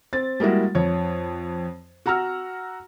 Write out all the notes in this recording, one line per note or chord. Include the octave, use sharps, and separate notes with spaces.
C4 A6
G3 G#3 A#3 E4 F#4
F2 C#5
F#4 F#5 A#5 E6 F6